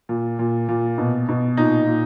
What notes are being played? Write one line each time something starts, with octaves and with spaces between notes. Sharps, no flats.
A#2
A#2
A#2
B2
B2
A#2 D#4
A#2